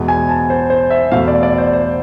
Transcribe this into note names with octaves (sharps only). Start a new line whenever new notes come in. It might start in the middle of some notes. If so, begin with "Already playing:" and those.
Already playing: E2 B2 G#3
G#5
A5
C5
C5
E5
E2 B2 A3 F5
D5
D5
C5
C5